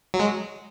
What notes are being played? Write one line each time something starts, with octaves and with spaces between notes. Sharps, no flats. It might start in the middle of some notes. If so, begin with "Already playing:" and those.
F#3
G#3